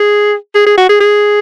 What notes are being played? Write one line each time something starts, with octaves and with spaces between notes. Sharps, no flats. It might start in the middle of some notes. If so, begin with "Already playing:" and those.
Already playing: G#4
G#4
G#4
F#4
G#4
G#4